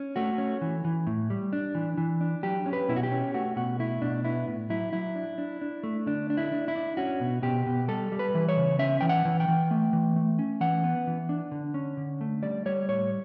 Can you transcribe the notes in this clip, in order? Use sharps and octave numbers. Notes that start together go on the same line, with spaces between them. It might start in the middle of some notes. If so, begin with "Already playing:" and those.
Already playing: C#4
A3 F#4
C#4
E3
E3
A2
G3
D4
E3
E3
D4
F#3 G4
C#4
B4
B2 E4
F#4
G4
C#4
A3 F#4
B2 F#4
A3 E4
B2 D4
B3 E4
A2
F#3 E4
F#3 E4
D4
D4
D4
A3
D3 D4
D4
E4
D4
E4
D4
C#4 F#4
B2
B2 G4
B2
G3 A4
G3
B4
E3
C#5
C#3
C#4 E5
E3 G5
F#5
E3
G5
E3
A3
E3
A3
C#4
E3 F#5
B3
E3
D4
D3
C#4
D3
A3
G3 D5
G3 C#5
A2 C#5